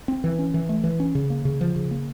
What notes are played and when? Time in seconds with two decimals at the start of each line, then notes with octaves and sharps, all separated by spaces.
0.08 C4
0.24 E3
0.39 C#4
0.54 E3
0.69 A3
0.84 E3
1.00 C#4
1.15 C#3
1.30 A#3
1.45 C#3
1.61 F3
1.76 C#3
1.91 A#3